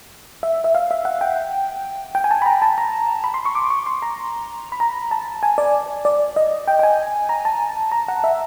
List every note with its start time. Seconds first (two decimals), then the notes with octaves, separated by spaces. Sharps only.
0.43 E5
0.64 E5
0.75 F5
0.91 E5
1.05 F#5
1.21 G5
2.15 G5
2.24 G#5
2.31 A5
2.42 B5
2.46 A#5
2.62 A5
2.78 A#5
3.24 B5
3.34 C6
3.45 C#6
3.55 D6
3.70 C#6
3.86 C6
4.02 A#5
4.72 B5
4.80 A#5
5.11 A5
5.43 G#5
5.58 D5
6.05 D5
6.36 D#5
6.68 G5
6.79 G5
6.83 G#5
7.29 A#5
7.45 A5
7.92 A#5
8.08 F#5
8.24 E5